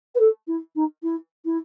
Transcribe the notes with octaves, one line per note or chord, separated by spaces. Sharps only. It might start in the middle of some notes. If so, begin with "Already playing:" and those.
B4
A4
E4
D#4
E4
E4